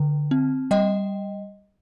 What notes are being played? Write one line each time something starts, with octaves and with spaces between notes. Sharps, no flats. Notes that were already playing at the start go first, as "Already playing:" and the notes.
Already playing: D3
C4
G3 D#5 G5